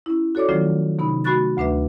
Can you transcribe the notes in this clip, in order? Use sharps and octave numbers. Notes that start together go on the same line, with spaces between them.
C#4 E4
F#4 A4 C#5 D5 D6
D#3 F3 F#3 A3 C#4 F4
C3 B3 D#4 B5
A3 F#4 B5 C#6 F#6 A6
D2 A3 D4 B4 E5